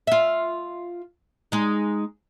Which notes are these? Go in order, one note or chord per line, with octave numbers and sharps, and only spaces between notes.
F4 E5
G#3 D#4